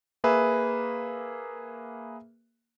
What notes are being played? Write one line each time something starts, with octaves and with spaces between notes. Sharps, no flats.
A#3 G#4 B4 E5